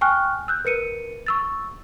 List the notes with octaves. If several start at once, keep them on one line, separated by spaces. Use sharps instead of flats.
G5 G#5 C#6 F6 F#6
E6 F#6 G6
A#4 B4 C#7 D#7
C#6 E6 A6